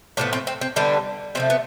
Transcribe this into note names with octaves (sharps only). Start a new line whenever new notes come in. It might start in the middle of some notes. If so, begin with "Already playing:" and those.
A2 F3 B3 D4
C4
C4
C4
D3 G3 B3 D4
C3 F3 A3 C4
B3